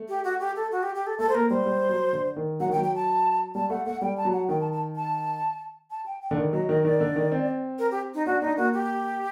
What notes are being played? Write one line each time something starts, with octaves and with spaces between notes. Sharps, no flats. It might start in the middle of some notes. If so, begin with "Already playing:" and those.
Already playing: A3
G4
F#4
G4
A4
F#4
G4
G4
A4
A3 A4
C5
A#3 A#4
G3 C5
G3
F#3
D3
D#3
F#3 F#5
D#3
G5
F#3
G5
A5
G3 A5
A3 F#5
A3 F#5
G3 G5
A5
F#3
F#5
D#3 G5
A5
A5
A5
A5
G5
G5
D3
D#3
F#3 D#5
D#3 D#5
D#3 D5
D3
D#3
C4
A#4
G4
D#4
D4 F#4
D4 D#4
A#3 F#4
G4